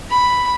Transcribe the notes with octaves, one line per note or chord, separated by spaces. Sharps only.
B5